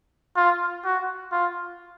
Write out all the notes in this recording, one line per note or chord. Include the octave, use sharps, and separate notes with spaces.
F4
F#4
F4